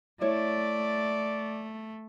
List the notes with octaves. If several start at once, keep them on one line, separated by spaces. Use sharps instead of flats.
A3 E4 C#5 D5